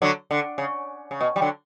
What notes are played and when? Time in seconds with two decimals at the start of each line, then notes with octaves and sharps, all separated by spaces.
0.02 D3 F#3
0.31 D3
0.58 C#3
1.11 C#3
1.21 B2
1.36 G3
1.41 D3 F#3